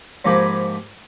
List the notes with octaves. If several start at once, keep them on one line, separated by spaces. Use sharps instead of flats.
G#2 F3 A#3 G4 G#5 B5